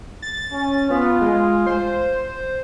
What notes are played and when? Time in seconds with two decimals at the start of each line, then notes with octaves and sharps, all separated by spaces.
0.22 A6
0.52 C#4
0.91 B3 F4
1.21 G#3
1.66 C5